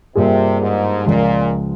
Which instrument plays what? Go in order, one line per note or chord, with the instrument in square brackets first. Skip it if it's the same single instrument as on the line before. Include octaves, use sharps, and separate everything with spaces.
[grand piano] G2 G3 A#3 F4 G#4 [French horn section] C3
[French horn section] G#2
[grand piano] C#2 C#3 F3 G#3 [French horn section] A#2